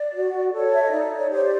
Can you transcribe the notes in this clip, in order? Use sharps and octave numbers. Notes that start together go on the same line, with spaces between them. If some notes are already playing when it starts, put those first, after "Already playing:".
Already playing: D5
F#4
A4 C#5
E5
D#5
D#4 D5
C#5
G4 C5 C#5
D5